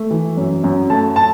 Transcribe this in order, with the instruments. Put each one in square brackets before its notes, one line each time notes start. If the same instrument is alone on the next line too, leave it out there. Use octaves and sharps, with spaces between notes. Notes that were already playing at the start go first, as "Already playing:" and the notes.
Already playing: [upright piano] A3
E3
F#2
F#2
A3 A5
A5